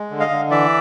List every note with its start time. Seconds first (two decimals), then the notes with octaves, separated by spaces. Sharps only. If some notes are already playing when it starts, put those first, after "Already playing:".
Already playing: G#3
0.11 D3
0.20 D#5 F5
0.31 D3
0.50 E3 D5 E5